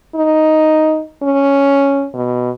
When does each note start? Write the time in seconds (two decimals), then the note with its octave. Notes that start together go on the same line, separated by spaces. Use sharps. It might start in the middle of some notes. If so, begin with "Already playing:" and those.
0.15 D#4
1.23 C#4
2.14 B2